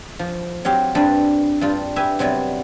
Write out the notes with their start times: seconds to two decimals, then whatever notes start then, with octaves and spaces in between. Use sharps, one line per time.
0.19 F3
0.65 F#3 C4 G4 F5
0.95 G2 C4 D4 B4 D5
1.61 G2 G3 F4
1.96 G4 B4 E5 G#5
2.19 C3 F#3 G3 B3